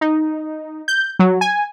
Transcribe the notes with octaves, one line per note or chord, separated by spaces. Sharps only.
D#4
G6
F#3
G#5